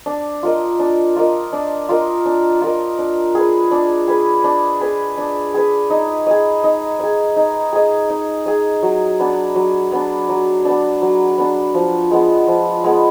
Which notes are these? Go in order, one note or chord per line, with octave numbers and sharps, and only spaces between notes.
D4
F4 A#4 D#5
D4
F4 A#4 D#5
D4
F4 A#4 D#5
D4
F4 A#4 D#5
D4
G#4 B4
D4
G#4 B4
D4
G#4 B4
D4
G#4 B4
D#4
G#4 D#5
D#4
G#4 D#5
D#4
G#4 D#5
D#4
G#4 D#5
F#3
B3 D4
F#3
B3 D4
F#3
B3 D4
F#3
B3 D4
F3
G#3 B3
F3
G#3 B3